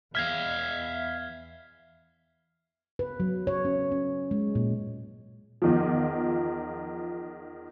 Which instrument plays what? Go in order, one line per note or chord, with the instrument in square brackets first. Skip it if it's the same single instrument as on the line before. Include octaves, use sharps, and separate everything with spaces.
[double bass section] E2 [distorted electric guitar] E5 F5 [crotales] F6 G#6
[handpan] B4
F#3
C#5
C#4
C#4
G#3
A#2
[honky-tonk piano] E2 D#3 F3